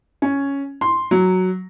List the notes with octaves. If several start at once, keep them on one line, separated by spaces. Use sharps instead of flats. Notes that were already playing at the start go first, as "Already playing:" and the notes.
C#4
C6
F#3